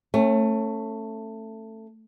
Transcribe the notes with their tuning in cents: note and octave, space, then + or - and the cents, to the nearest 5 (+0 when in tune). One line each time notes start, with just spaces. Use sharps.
A3 +15 C#4 -25